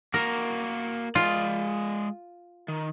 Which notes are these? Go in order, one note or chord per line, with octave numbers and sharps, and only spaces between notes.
A#3 F#4 A#4
G#3 F4 D5
D#3